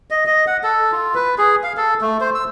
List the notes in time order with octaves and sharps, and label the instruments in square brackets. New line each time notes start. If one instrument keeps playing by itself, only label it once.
[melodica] D#5
D#5
F#5
A4
F4
B4
G#4
F5
A4
A3
C5
E6